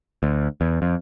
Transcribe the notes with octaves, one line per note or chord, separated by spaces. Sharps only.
D2
E2
F2